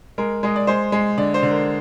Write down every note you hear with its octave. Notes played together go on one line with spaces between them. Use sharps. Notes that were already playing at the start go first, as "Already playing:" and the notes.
G#3 A#4
G#3 D#5
D5
G#3 C5
G#3
D3 D5
C5
D3
A#4